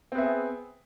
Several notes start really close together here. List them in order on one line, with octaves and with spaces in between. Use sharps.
C4 B3 E5 G#4